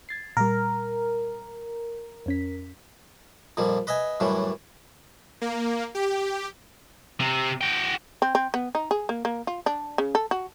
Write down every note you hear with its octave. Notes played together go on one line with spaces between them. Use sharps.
G#6 A6 C7
A#2 G3 A#4
F2 C#4 B6
F2 A#2 F3 G3
B4 D#5 E5 G#5
F#2 A2 D3 E3 G3
A#3
G4
C3
F#4 G5
C4
C4
B3
D#4
G#4
A#3
A#3
F4
D4
C#3
A4
F#4